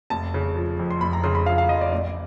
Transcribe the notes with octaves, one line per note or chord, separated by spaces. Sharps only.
F1 A5
C#3
F3
F2
C6
F1 B5
A#5
C#3 C6
B5
F3 F5
F5
F2 D#5
D5
A1 D5